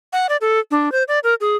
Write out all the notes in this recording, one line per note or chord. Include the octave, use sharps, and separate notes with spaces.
F#5
D5
A4
D4
C5
D5
A#4
G#4